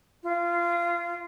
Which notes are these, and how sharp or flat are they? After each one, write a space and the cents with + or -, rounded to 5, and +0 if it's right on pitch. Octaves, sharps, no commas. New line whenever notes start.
F4 -20